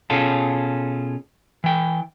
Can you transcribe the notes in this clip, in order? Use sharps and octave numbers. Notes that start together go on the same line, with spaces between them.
B2 C#4 F4 G#4 A4
E3 G5